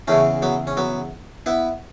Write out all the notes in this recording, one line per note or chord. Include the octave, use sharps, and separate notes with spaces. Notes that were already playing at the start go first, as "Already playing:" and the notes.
E2 C#3 E3 A3 C#4
F#3 B3
C#4
F#3 B3
B3 E4